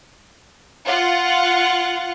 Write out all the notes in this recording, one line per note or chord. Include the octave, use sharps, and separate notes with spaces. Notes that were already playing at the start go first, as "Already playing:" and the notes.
F4 F#5